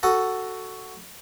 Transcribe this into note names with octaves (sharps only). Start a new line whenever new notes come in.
F#4 A4 D#6